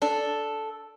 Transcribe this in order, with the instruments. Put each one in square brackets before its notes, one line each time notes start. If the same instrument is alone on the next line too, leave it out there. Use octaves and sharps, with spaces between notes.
[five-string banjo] D4 [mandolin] A4